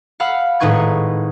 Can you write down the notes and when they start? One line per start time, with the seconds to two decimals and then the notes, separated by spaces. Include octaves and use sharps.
0.20 F5 F#5 B5 E6
0.60 G#1 A2 D#4 B4 C#6 G#6